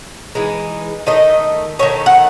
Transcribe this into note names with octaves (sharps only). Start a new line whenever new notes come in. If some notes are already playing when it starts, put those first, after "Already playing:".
E3 G#3 D#4
D#3 A3 D#4 D#5
D#3 A3 D#4 C#5
F#5